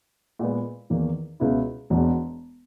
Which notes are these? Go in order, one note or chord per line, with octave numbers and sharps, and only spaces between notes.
A#2 G#3 B3
E2 D#3 A#3
C#2 B2 G#3 B3 E4
E1 E2 B2